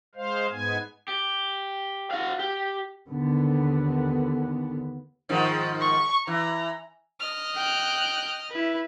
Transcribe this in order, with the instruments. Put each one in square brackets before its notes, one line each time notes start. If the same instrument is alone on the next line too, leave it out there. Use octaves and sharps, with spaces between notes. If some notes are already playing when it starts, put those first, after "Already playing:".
[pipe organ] G#3 C5 F5
G#2 G#3 B3 G#5
[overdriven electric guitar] G4
F#4 F5
G4
[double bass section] D#2 D3 B3
[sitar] G#2 D#3 F3
[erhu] C#6
[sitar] E3 [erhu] A#5
[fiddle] D#5 F6
[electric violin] G5 F#6
E4 B4